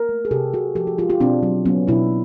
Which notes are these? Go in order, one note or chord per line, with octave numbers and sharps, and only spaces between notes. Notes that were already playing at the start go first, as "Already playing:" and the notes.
Already playing: A#4
A3
G#4
C3 G4 A4
C3 F#4 G#4
F3 G4 A4
F#4 G#4
G#3 F4 G4
F4 G4
B2 C4 D4
F#3
F#3 B3 C#4
B2 D4 E4